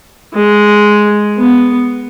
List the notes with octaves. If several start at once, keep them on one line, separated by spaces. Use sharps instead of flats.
G#3
B3